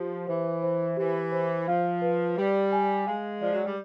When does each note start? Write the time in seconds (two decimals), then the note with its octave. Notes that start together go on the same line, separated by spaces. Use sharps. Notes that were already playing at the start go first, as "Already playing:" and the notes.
Already playing: F3 G4
0.27 E3 C5
0.62 C5
0.97 E3 G4
1.32 C5
1.67 F3 F5
2.02 B4
2.37 G3 D5
2.72 G#5
3.06 G#3 F5
3.41 F3 D5
3.53 F#3
3.65 G3